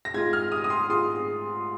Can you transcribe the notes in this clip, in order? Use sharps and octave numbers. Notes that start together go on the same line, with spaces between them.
A#6
G#2 G#3 F4 G#6
F6
D#6
D#6
C6
G#2 G#3 F4 C6